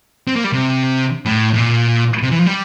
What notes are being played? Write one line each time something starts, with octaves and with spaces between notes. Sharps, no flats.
C4
A#3
G3
C3
A2
A2
A#2
C3
E3
F3
G3